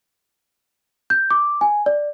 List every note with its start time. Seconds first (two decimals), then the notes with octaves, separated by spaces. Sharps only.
1.10 G6
1.31 D6
1.61 G#5
1.86 D5